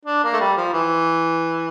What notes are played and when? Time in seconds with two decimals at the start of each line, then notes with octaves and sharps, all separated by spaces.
0.05 D4
0.23 A#3
0.33 A3
0.40 G3
0.57 F3
0.73 E3